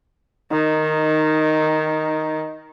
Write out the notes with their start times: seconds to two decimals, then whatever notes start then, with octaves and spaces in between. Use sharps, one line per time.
0.51 D#3 D#4